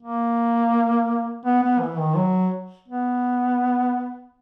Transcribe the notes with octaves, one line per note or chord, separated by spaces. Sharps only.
A#3
B3
B3
E3
D#3
F#3
B3